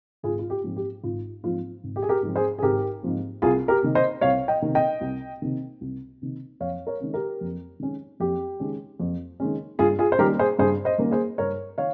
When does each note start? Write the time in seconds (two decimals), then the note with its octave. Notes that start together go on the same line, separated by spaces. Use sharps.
0.23 G#1 F4 G#4
0.39 F4
0.50 G4
0.64 G#2 F3 C4
0.76 G4
1.03 G#1 F4
1.43 G#2 F3 C4 F4
1.83 G#1
1.96 G4
2.02 G#4
2.09 G4 A#4
2.23 G#2 F3 C4
2.36 G#4 C5
2.59 G#4
2.62 G#1 G4 A#4
3.03 G#2 F3 C4
3.42 C2 F4 G#4
3.68 G4 A#4
3.82 C3 D#3
3.95 C5 D#5
4.21 C2 C#5 F5
4.48 D#5 G5
4.62 C3 D#3
4.75 D#5 G5
5.01 C2
5.42 C3 D#3
5.81 C2
6.22 C3 D#3
6.60 F2 C#5 F5
6.87 A#4 C#5
7.00 D#3 G#3 C#4
7.14 G4 A#4
7.41 F2
7.80 D#3 G#3 C#4
8.20 F2 G4
8.60 D#3 G#3 C#4
9.00 F2
9.40 D#3 G#3 C#4
9.79 G2 F4 G#4
9.99 F4 G#4
10.12 C5
10.18 D#3 G3 A#3 C#4 G4 A#4
10.39 G#4 C5
10.59 G2 G#4 C5
10.85 C5 D#5
10.98 D#3 G3 A#3 C#4
11.11 G#4 C5
11.38 G2 A#4 C#5
11.78 D#3 C#5 F5